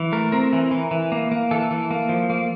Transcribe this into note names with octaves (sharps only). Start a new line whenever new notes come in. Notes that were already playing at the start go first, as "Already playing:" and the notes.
Already playing: E3
A3 A#4
C4 A#4
E3
E3
E3
A#3
A#3
E3 A4
E3
A#3
F3
A#3